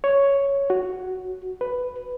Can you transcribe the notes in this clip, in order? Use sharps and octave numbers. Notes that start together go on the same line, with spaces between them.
C#5
F#4
B4